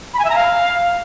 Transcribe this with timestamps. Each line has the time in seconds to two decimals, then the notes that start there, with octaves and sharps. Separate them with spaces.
0.14 B5
0.19 G#5
0.25 E5
0.30 A#5
0.35 F5